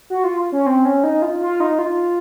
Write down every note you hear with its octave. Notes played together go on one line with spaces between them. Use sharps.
F#4
F4
C#4
C4
C#4
D#4
F4
F4
D#4
F4